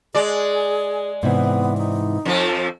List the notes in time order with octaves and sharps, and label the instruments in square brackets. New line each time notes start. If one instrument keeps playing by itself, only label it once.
[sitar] G#3 D5 [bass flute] G#4
[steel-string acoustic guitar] G#2 C3 E3 [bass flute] B3
[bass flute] D#4
[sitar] F2 F3